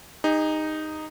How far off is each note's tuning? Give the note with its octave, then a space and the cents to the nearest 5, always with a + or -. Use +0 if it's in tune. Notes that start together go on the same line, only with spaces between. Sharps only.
D#4 -5 G#4 -45